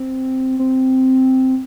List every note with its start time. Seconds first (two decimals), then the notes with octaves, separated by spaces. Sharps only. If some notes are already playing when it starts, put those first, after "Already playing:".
Already playing: C4
0.59 C4